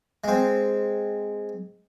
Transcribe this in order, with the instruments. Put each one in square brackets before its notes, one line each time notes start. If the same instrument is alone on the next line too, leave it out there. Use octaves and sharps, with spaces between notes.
[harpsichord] G#3 C4